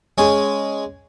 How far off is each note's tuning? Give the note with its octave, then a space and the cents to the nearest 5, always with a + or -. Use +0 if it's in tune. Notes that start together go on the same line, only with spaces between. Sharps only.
G#3 +0 C#4 +0 G#4 +0